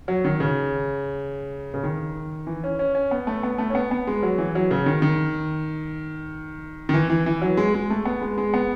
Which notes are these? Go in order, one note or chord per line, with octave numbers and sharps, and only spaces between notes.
F#3
D#3
C#3
C#3
D#3
E3
C#4
C#4
C#4
B3
A3
B3
A3
C#4
B3
B3
G#3
F#3
E3
F#3
C#3
D#3
D#3
D#3
E3
E3
E3
F#3
G#3
G#3
A3
B3
G#3
G#3
B3